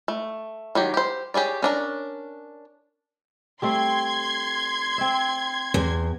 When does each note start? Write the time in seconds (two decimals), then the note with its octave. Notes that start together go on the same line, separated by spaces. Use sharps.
0.08 A3
0.75 D#3 F#3 G4
0.94 G4 C5
1.34 G4 G#4 C#5 D5
1.62 C#4 D4 A#4
3.62 G3 A3 C4 C6 G#6
4.98 C4 E5
5.74 E2